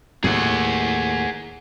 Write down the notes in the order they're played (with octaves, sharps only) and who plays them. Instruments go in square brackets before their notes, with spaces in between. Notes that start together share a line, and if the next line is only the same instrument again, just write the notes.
[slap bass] D#2 A2 [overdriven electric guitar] G#4 F#5